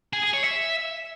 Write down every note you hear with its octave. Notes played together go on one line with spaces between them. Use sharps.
G#4
G#4
C#5
E5